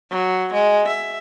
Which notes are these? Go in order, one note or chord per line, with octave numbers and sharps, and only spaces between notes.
F#3
G#3
E5